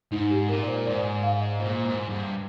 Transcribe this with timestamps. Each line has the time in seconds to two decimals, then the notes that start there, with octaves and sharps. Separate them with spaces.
0.12 G#2 D#4
0.31 G4
0.49 A#2 A#4
0.63 D5
0.68 C5
0.86 G#2 D5
1.23 F5
1.41 D#5
1.60 A#2 C5
1.85 G#2
2.09 G2